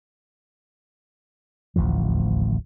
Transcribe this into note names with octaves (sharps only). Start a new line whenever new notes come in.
D1 A1 D#2 F3